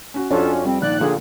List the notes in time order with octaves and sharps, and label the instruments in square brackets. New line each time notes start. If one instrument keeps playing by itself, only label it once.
[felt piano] C#4 F#4
[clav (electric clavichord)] F2 [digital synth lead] C#4 [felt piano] D4 F4 F#4 [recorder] A4
[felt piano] G3 [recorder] C4
[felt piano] A#1 D#3 [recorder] D5 [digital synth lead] F#6
[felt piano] A#1 D3 A#3 [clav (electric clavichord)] A#2 [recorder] G#4